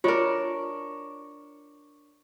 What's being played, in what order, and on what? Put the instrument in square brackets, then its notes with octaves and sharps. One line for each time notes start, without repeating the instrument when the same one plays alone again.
[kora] D4 A#4 [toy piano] F4 [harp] C#5 D5